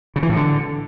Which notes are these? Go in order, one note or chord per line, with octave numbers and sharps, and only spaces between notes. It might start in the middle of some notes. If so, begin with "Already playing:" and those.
C#3
E3
A2
D3